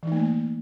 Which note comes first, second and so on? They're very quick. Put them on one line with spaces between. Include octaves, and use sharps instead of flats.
E3 D#4 A3 A#3